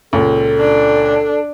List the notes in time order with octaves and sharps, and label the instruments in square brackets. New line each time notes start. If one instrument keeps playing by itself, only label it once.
[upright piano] C#2 A#2 [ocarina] A4
[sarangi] D4